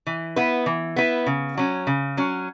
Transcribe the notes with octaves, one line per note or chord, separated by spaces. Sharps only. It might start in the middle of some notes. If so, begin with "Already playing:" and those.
E3
B3 E4 B4
E3
B3 E4 B4
C#3
F#3 C#4
C#3
F#3 C#4